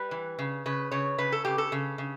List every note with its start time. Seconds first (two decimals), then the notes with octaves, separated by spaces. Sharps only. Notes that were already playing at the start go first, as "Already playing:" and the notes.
Already playing: G3 B4
0.11 E3
0.39 C#3
0.66 C#3 B4
0.91 C#3 C#5
1.18 C#3 B4
1.32 A4
1.45 C#3 G4
1.58 A4
1.72 C#3
1.98 C#3